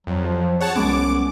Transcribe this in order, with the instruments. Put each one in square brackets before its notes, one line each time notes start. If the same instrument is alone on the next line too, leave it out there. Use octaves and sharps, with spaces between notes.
[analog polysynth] F2 [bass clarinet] F#3
[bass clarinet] F3 [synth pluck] F4
[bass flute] G#4 [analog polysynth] C#5 F#5 A5
[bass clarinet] C2 [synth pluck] F#3 G#3 B3 [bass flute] C#4 [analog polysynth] D6